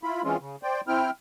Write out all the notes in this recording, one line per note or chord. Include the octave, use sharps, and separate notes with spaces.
E4 F4 B5
E3 G#3 C4 C#4 F4
C#3
C5 D5 G5
C4 E4 G5 F6